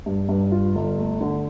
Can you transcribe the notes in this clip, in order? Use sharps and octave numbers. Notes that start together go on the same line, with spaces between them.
G2
G2
F4
G1
A3
D3